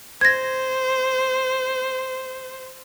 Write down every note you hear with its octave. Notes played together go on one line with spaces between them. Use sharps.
C5 G#6 A#6